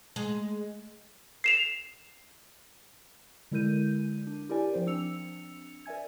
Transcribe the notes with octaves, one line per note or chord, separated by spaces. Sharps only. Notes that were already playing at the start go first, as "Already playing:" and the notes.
G#3
C7 E7 F7
D3 G#3 E4 A#4 G6 D#7
D4
E4 G4 A#4 D5 G#5
F3 C4 C5
C4 D4 E6 C#7 F7
A#4 D5 E5 G#5 G#6